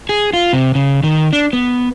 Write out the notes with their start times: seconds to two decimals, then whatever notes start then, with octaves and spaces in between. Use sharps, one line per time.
0.09 G#4
0.33 F4
0.53 C3
0.75 C#3
1.03 D#3
1.33 D4
1.53 B3